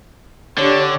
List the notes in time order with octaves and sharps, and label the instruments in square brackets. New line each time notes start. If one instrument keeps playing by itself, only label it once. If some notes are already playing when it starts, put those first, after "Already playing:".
[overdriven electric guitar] D3 [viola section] D4 G4 C#5